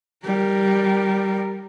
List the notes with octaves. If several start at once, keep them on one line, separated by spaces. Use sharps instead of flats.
G3 A#4